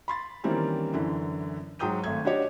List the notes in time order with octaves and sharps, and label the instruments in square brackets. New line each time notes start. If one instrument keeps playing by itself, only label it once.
[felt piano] B5 C6 A6
D#3 E3 G3 A#3 C4 C#4
F#2 D3 E3
G#2 F#3 G5 D#6 G6 D#7
G#1 A3 G#6
D4 F#4 G4 C#5 D#5